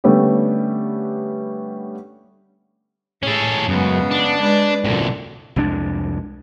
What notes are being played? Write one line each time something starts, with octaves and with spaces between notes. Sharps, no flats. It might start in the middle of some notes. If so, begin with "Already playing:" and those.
D3 G3 A3 B3 C#4 G4
A2 C#4 G#4 A4
F#2 C#3 G#3 B3
D4
G#3 B4 D5
C2 F#2 A#2 D3
C2 F2 G#3 D4